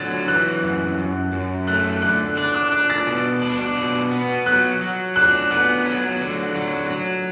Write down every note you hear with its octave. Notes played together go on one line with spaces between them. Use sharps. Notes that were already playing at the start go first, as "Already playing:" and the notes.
Already playing: D3 F#3 A6
E3 F#6
F#2
F#2
F#2
A3 F#6
D3 F#6
D4 F#6
D6
D4 F#6
A6
B2
D4
B2
B3
F#3 F#6
F#3
D4 F#6
B3 F#6
F#3
D3
F#3
F#3